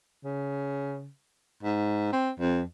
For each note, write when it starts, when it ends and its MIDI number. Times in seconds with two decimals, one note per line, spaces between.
0.24 1.10 49
1.63 2.11 44
2.12 2.30 60
2.40 2.62 41